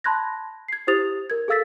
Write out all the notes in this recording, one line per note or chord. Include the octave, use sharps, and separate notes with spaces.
A5 B5 C6 F#6 G#6 A#6
G#6 C7
E4 G4 C5 D#6 A6 F7
A#4 G#6
G#4 A4 F5 E6 A6 B6